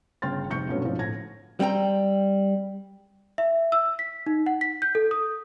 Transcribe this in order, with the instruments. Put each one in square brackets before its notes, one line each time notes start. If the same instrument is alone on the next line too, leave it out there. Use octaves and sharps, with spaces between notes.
[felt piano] G1 C#3 G5 C6 F6 A6
F1 G#2 C3 C#6 G6 C#7
G2 B2 F#3 A3 C#4
G#2 D3 F3 C4 C#4 F4
A2 G#6 A#6
[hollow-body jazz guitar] G3 C4 G5 A#5
[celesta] E5
E6
B6
D#4
F#5
B6
G6
A4
D#6